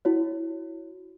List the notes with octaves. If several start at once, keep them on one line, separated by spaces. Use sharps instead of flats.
E4 F#4 C#5